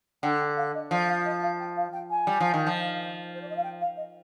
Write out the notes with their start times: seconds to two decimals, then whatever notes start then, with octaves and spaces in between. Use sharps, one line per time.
0.23 D3 G5
0.40 G5
0.56 F5
0.74 D#5
0.91 F3 D5
1.08 F5
1.25 D#5
1.42 F5
1.59 G5
1.76 F5
1.93 G5
2.10 G#5
2.27 G3
2.40 F3
2.54 D#3
2.67 F3
3.35 C5
3.42 D5
3.49 D#5
3.56 F5
3.63 G5
3.81 F5
3.97 D#5